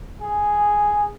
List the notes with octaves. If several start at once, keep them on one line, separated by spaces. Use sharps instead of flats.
G#4